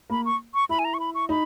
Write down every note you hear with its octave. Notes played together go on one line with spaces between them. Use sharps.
A#3 B5
C#6
C#6
E4 B5
G#5
A#5
C#6
B5
C#6
D#4 B5